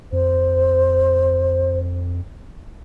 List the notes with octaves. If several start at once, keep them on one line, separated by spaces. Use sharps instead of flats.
F2 C5